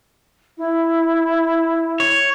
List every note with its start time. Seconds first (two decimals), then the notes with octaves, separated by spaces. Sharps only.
0.58 E4
2.00 C#5